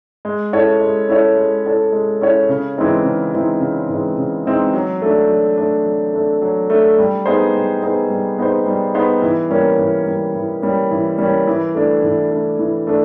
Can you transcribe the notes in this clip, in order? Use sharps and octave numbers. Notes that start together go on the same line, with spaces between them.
G#3
C#4 E4 A4 C#5
G#3
C#4 E4 A4 C#5
G#3
C#4 E4 A4 C#5
G#3
C#4 E4 A4 C#5
C#3
E3 G#3 C4 D#4
C#3
E3 G#3 C4 D#4
C#3
E3 G#3 C4 D#4
C#3
E3 G#3 C4 D#4
F#3
A3 D4
F#3
A3 D4
F#3
A3 D4
F#3
A3 D4
G3
B3 D#4 G#4 C5
G3
B3 D#4 G#4 C5
G3
B3 D#4 G#4 C5
G3
B3 D#4 G#4 C5
E3
G3 A#3 C#4
E3
G3 A#3 C#4
E3
G3 A#3 C#4
E3
G3 A#3 C#4
E3
A3 D4
E3
A3 D4
E3
A3 D4